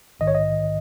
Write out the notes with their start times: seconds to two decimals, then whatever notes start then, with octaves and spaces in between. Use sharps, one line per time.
0.20 A#1 G#2 D#3 D#5
0.27 C#5
0.35 D#5